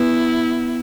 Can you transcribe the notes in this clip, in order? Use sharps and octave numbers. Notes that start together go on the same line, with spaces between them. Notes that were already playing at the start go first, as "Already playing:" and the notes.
Already playing: B3 E4